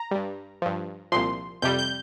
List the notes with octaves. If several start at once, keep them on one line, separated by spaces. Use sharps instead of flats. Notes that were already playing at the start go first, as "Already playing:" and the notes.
Already playing: A#5
G2 G3
G2 F3
C2 A#2 F3 C6
F2 C3 G3 G6
G6